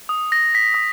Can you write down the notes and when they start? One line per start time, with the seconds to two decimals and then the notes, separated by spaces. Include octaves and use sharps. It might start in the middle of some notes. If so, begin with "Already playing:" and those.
0.09 D#6
0.32 A#6
0.55 B6
0.74 D#6